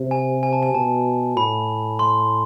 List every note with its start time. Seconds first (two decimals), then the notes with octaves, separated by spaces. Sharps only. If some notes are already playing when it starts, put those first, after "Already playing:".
Already playing: C3
0.11 G#5
0.43 G#5
0.53 A5
0.63 G#5
0.75 B2 A5
1.37 A2 B5
1.99 C6